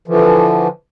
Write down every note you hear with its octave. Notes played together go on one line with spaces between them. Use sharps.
D3 E3 F3